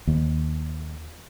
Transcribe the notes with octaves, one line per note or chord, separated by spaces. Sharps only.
D#2